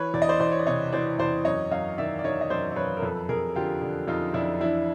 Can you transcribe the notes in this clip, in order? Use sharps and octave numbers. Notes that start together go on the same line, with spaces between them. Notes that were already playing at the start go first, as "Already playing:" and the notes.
Already playing: E3 B4 C#5
E2 D5
D#5
C5 D5
E2 C5 D5
C#5
D5
C3 C#5 D#5
E3 C5 D5
E2 C5 D5
F#2 C#5 D#5
F#2 D#5 F5
D#3 D5 E5
D5
D#3 C#5 D#5
D#5
F#2 C5 D5
D5
F#2 B4 C#5
A#4
F2 A4 B4
F2 G#4 A#4
D3 F4 G4
D3
F2 D#4 F4
F2 D4 E4
E3 D4 E4